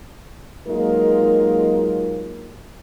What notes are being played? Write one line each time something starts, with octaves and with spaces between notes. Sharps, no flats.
F#3 G#3 A#3 D#4 F4 A#4